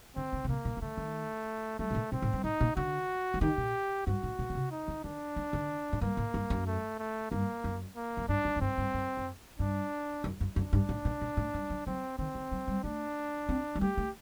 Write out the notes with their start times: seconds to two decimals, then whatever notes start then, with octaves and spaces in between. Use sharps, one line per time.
0.16 D3 C4
0.33 D3
0.44 C3
0.49 A#2 A#3
0.65 A#2
0.77 D#3
0.82 D3 A3
0.98 D#3
1.79 G3 A3
1.91 C3
1.95 A#2
2.12 A#2 C4
2.22 A2
2.33 G2
2.44 A2 D#4
2.60 A#2
2.76 D3 F#4
3.34 F#3
3.41 D#3 G4
3.58 A#2
4.07 G2 F#4
4.23 A2
4.39 A#2
4.50 D3
4.55 C3
4.71 D#4
4.88 D3
5.04 D#3 D4
5.36 A#3
5.53 D3
5.93 A2
6.01 G2 A#3
6.17 A2
6.34 G2
6.50 F#2
6.67 A3
6.99 A3
7.31 G2 A#3
7.64 F#2
7.96 A#3
8.17 F#2
8.29 G2 D4
8.45 F#2
8.56 F#2
8.61 G2 C4
8.78 G2
8.94 F#2
9.17 F#2
9.59 G2 D4
10.24 F#2
10.40 F#2
10.56 F#2 D4
10.73 G2
10.89 A2
11.05 A#2
11.21 A#2
11.37 A2
11.54 G2
11.70 F#3
11.87 F#3 C4
12.18 D#3 C4
12.35 D#3
12.52 F#3
12.68 G3
12.84 A3 D4
13.49 C4
13.76 G3
13.81 A3 G4
13.97 A3